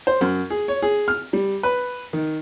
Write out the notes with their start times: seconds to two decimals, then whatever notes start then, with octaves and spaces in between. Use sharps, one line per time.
0.07 C5
0.21 F#2
0.50 G#4
0.68 C#5
0.82 G#4
1.08 F6
1.33 G3
1.63 B4
2.13 D#3